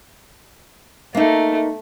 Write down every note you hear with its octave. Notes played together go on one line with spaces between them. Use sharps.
A3 A#3 D#4